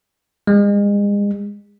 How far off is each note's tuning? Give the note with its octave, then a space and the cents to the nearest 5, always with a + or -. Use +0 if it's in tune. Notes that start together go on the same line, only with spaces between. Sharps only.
G#3 -35